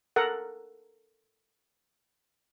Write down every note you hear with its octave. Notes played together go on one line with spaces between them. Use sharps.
A4 A#4 F#5